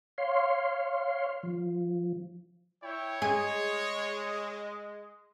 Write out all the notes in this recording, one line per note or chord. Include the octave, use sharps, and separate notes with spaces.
C#5 F5 C6
F3
E4 C#5 G5
G#3 G#4 D#5